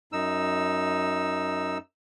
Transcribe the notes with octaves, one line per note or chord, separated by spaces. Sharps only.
F#2 D#4 E6